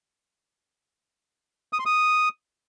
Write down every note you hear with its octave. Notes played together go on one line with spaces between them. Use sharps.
D#6
C6
D#6